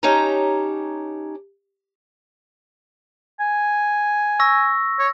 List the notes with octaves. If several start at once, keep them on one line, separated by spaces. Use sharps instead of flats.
C#4 D#4 G4 C#5 A5 A#5
G#5
C#6 E6 A#6
C#5